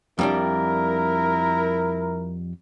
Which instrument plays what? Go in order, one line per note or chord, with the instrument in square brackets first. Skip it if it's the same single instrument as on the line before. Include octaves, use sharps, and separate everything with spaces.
[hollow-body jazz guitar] F2 G3 D4 [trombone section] E4 A#4